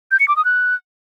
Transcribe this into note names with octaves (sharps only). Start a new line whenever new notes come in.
G6
C#7
D6
D#6
F#6